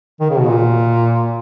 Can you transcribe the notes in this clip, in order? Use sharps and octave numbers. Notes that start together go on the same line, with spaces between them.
D#3
C#3
B2
A#2